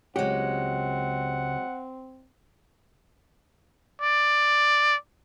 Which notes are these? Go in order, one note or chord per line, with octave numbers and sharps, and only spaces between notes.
C#2 F#3 G#3 C4 G4 F#5
D5